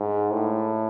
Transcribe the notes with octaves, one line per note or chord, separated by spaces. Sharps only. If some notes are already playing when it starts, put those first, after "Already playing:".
Already playing: G#2
A2